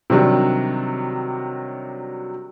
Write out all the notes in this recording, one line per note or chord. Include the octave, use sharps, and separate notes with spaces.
C3 D#3 F#3 G3 D4